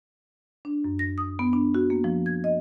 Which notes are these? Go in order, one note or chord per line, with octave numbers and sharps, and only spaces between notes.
D4
F#2
A#6
D#6
B3
D4
F#4
A#3
F3
G#6
D#5